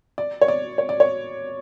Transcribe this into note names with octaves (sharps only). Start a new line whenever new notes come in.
D5
C#5
D5
C#5
D5
C#5